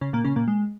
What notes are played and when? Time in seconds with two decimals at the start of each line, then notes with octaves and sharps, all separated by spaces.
0.01 C#3 C#4
0.13 A#2 A#3
0.24 C#3 C#4
0.36 A#2 A#3
0.48 G#3